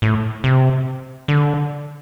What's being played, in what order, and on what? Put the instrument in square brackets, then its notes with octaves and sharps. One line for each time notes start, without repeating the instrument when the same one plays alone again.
[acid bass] A2
C3
D3